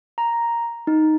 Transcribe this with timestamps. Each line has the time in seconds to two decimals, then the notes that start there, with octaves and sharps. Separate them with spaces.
0.18 A#5
0.87 D#4